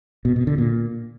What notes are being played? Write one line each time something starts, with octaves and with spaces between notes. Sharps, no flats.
B2
B2
D3
A#2